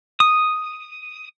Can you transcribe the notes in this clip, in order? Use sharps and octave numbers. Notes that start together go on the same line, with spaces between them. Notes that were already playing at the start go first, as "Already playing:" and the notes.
D#6